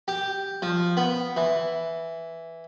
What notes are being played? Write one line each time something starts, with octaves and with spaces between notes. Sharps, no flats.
G4
F3
B3
E3